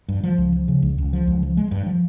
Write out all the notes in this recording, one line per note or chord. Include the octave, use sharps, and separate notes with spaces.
G2
F3
C#2
F3
C#3
C#2
C#2
F3
C#2
F3
G#3
G2
F3